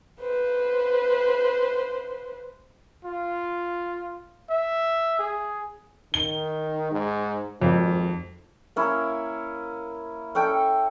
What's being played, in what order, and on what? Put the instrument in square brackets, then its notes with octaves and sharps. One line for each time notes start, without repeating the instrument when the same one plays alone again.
[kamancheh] B4 C5
[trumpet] F4
E5
G#4
[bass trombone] D#3 [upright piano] G7
[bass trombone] G#2
[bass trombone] G#1 [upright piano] F2
[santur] A#3 C#4 E4
C#4 A4 G5